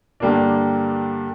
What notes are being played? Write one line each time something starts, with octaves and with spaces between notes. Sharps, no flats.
G2 D3 G3 A#3 D4